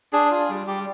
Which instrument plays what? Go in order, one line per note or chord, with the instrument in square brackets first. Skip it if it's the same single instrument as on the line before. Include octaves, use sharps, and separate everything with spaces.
[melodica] D4 G#4
F4
G3
G3 G4